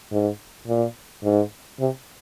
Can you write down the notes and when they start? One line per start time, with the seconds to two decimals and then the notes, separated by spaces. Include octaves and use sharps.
0.11 G#2
0.67 A#2
1.23 G#2
1.79 C3